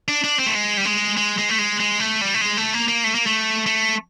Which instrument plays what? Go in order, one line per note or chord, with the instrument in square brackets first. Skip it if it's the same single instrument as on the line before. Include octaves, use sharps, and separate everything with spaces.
[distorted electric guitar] D4
D4
C4
A3
G#3
G3
G#3
G#3
G#3
A3
G#3
G#3
A3
G3
A3
G#3
A3
A#3
A#3
A3
A#3
A3
A3